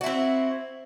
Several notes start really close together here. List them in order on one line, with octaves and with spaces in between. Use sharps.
F#4 E4 C4